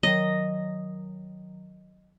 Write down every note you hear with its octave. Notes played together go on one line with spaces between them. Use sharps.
D#3 F#3 D#5